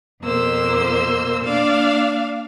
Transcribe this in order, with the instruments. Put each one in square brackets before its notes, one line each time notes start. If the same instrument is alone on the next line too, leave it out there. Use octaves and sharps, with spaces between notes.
[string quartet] F2 B2 A#3 C5 E6
A#3 D4 D5 F5